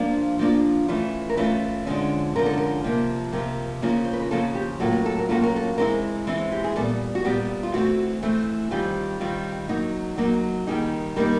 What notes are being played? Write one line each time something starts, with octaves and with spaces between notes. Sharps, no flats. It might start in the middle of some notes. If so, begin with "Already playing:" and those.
Already playing: F3 A#3 D4 F4
F3 A#3 D4 F4
E3 A3 C#4 F4 B4
A#4
E3 A3 C#4 F4 B4
D3 F3 G#3 C#4
D3 F3 G#3 C#4 A#4
A4
A#4
C3 F3 A#3
C3 F3 A#3 A#4
C#3 F3 A#3 C#4 F4
C5
B4
A#4
C#3 F3 A#3 C#4 F4 A4
G4
A2 F#3 A#3 C#4 F4 A4
A#4
A4
A#4
A2 F#3 A#3 C#4 F4 A4
A#4
A4
E3 G#3 C4 E4 A#4
E3 G#3 C4 E4
G4
G#4
A#2 G3 B3 A4
F#4
A#2 G3 B3 G4
F4
E3 A3 C4 F#4
E3 A3 C4
D#3 G3 C4 F4 G4
D#3 G3 C4 F4
F#3 A#3 D#4
F#3 A#3 D#4
D#3 G3 A#3 D#4 G#4
D#3 G3 A#3 D#4 A#4